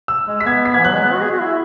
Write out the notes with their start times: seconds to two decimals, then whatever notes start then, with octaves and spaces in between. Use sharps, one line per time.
0.08 E6
0.27 G#3
0.40 G#3 B6
0.46 B3 G#6
0.65 B6
0.74 E3 G#6
0.85 F#3 F#6
0.94 G#3
1.03 B3
1.13 F#4
1.21 G#4
1.31 F#4
1.40 E4